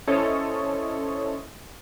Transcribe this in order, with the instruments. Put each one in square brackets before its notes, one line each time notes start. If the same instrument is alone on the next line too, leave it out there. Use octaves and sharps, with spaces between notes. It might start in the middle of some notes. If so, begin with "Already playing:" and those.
[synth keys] C#4 E4 A4 C5 C#5 D#5